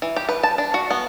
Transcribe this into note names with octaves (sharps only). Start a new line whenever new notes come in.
E3
G4
B4
A5
D4
F#4
B3